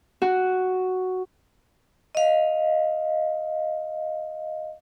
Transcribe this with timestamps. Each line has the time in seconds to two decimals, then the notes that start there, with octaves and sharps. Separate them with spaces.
0.22 F#4
2.15 D#5 F5